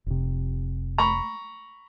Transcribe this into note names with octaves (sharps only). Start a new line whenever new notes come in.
F1 C3
A#5 B5 C#6